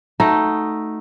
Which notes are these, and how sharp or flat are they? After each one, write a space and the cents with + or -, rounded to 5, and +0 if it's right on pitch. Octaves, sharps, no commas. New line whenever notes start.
A3 +0 D#4 +0 F#4 +0